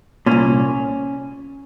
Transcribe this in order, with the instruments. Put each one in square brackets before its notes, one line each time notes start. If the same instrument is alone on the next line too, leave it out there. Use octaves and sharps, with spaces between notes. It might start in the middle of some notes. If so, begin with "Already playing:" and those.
[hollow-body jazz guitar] C2 A#2 C#4